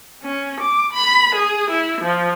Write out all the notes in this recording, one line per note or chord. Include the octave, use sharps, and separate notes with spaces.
C#4
D6
B5
G#4
E4
F3